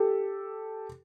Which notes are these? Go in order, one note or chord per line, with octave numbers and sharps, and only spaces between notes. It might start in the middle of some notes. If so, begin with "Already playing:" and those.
Already playing: G4 A4